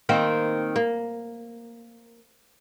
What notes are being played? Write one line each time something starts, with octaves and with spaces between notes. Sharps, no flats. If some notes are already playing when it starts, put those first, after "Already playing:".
D#3 A#3 C4
A#3